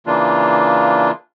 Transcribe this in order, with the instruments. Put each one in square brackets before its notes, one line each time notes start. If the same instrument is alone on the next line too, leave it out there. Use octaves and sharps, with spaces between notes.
[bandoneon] C#3 E3 A#3 D4 F4